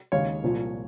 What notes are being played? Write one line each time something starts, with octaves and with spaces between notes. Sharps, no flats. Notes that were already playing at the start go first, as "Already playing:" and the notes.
D#2 C#3 G#3 C#5 F5
C2 A#2 F3